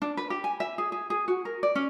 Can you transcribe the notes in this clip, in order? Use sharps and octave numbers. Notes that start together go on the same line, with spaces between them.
D4
B4
G4
G#5
E5
G#4
G#4
G#4
F#4
A#4
D5
C#4